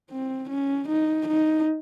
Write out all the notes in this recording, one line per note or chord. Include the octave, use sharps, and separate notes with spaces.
C4
C#4
D#4
D#4